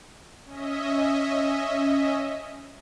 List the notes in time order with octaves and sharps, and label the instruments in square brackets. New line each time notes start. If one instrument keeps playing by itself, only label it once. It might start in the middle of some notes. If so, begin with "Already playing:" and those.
[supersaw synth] C#4 D#5 E5